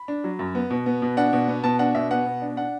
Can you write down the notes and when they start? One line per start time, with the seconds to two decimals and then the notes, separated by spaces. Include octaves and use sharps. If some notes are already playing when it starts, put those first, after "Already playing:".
Already playing: B5
0.08 D4
0.24 F#3
0.39 F#2
0.55 B3
0.71 B2
0.86 B3
1.02 B2
1.17 D4 F#5
1.33 B2
1.48 B3
1.64 B2 A5
1.79 D4 F#5
1.95 B2 E5
2.11 B3 F#5
2.26 B2
2.42 D4
2.57 D4 F#5